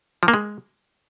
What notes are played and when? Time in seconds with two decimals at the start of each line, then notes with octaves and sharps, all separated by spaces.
0.23 F3
0.28 A#3
0.34 G#3